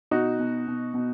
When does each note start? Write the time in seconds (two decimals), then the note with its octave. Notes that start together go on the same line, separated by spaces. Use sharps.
0.11 B2 D#4 F#4
0.39 B2
0.67 B2
0.94 B2